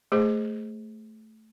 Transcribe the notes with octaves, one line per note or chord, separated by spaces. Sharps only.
A3 G#4 C5